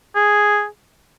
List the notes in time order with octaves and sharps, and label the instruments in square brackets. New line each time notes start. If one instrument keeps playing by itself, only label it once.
[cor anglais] G#4